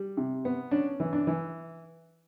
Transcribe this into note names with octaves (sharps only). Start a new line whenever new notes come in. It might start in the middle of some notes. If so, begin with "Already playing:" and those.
Already playing: G3
C3
B3
C#4 D4
E3
D4
E3